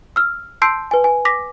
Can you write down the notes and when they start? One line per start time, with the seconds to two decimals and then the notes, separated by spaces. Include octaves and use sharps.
0.16 E6 F6
0.62 A5 C6 E6 G6 C7 D7
0.91 B4 G#5
1.04 G#5
1.25 D6 A#6 B6